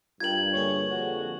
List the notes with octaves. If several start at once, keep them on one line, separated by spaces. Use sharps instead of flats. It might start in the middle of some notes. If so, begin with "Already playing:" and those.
G2 F4 A#4 G5 G#6 F#7
D3 A#3 G#4 C#5
F2 F#4